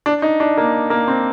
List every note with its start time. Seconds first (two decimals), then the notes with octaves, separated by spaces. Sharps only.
0.06 D4
0.22 D#4
0.40 D4
0.57 A#3
0.90 A#3
1.08 C4